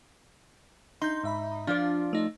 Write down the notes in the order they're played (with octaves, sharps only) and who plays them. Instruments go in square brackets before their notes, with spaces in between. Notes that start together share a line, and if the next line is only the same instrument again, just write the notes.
[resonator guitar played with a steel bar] D#4 [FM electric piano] C6 G6
[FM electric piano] G#2 E5 B5
[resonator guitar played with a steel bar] F3 F4 D5 [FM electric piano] D4
[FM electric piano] A3 D#4